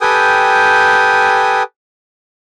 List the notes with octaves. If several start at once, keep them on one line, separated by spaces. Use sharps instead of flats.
G4 A4 B4 G5 G#5 D#6